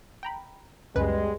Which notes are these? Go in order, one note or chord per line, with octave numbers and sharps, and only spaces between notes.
G5 A#5 B5
C#2 F#2 B2 G3 G#3 B4